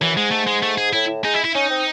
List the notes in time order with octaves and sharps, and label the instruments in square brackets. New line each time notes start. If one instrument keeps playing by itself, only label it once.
[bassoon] F#2 [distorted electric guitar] E3
[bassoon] G#2 [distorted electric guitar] G#3
[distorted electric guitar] A3
G#3
A3
G#4
[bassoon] A2 [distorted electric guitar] E4
[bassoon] G#3 [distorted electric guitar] D#4
[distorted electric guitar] E4
E4
[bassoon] C#4 [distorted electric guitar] D#4
[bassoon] C4